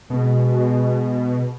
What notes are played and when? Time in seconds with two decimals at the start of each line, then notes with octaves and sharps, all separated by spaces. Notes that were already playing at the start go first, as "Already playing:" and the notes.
0.10 B2 G#3